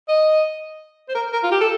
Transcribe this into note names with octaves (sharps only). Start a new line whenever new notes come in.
D#5
C5
A#4
A#4
F4
G4
A4